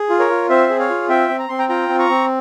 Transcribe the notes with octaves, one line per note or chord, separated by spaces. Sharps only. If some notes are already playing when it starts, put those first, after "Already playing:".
Already playing: G#4
F4
A#4 C#5
F4
C4 C5 E5
G#4
C#5 F5
F4
C4 E5 G5
C4
A#5
C4 C6
G5 A#5
F4 G5 A#5
C4
A#5 C#6
C4